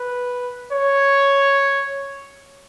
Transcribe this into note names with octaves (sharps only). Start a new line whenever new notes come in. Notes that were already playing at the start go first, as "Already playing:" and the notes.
Already playing: B4
C#5